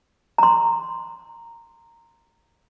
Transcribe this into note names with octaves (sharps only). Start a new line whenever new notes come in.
A#5 C6